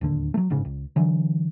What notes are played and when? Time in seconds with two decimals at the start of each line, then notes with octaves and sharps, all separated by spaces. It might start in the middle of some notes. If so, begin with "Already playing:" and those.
0.01 D1 D#2 D3
0.34 F#3 A3
0.50 G1 G#2 C#3
0.65 C#2
0.96 D3 E3 F#3